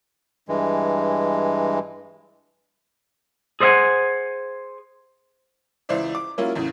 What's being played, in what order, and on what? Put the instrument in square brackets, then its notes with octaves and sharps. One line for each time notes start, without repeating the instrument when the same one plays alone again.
[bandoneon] G2 E3 G#3
[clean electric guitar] G#4 C5 D5 E5 F#5 G#5
[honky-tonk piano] C#2 E3 C5 D5 E5
D6
F#3 A#3 C#4 E4 F4
E2 A2 C#3